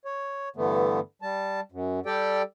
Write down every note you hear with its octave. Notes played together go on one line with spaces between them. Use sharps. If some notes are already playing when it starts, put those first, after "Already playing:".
C#5
G2 D3 E3 A3 B3
G3 A5
F#2
G3 G4 A4 D5 G5